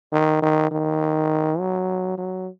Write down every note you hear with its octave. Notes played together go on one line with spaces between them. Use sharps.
D#3
D#3
D#3
F#3
F#3